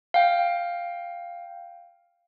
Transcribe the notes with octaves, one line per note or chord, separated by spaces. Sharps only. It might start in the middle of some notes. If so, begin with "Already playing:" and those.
F5 G5